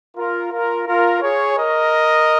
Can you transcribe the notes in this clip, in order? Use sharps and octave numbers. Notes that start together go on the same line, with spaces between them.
F4 A#4
F4 A#4
F4 A#4
G#4 C#5
A#4 D#5